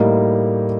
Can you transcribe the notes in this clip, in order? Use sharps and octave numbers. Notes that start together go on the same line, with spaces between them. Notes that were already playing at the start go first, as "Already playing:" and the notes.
Already playing: A2 G3 A#3 D#4